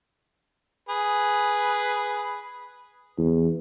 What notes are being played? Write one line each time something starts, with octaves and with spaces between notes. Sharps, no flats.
G#4 B4
E2